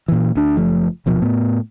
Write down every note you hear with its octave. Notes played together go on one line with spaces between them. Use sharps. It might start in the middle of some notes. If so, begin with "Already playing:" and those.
A#2 E3
D2 D4
F#1 F3 A3
D1 B2 F3
A2 B3